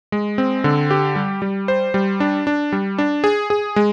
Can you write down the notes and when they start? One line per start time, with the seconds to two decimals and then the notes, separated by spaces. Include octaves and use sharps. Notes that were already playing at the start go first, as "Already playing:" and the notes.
0.12 G#3
0.38 C4
0.64 D3
0.91 G4
1.16 G3
1.42 G3
1.68 C5
1.94 G3
2.20 D4
2.47 D4
2.72 G3
2.98 D4
3.24 G#4
3.50 G#4
3.76 G#3